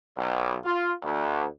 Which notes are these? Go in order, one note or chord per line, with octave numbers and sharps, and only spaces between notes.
B1
F4
D2